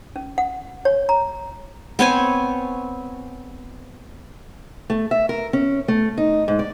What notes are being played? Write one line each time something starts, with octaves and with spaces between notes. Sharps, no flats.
C#4
F#5
C#5
A#5
B3 C4 C#5 G#5
A3
E5
A#4
C#4
A3
D#4
G#2
D5